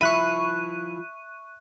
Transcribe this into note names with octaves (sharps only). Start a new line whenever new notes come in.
F3 E4 E5 B5 C#6 F#6 D#7